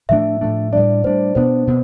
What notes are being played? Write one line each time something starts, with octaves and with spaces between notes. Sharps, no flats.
A2 F3 A3 D4 E5
A2 F3 A3 D4
A2 G3 D4 D5
A2 G3 D4 C5
B2 B3 D4 C5
B2 B3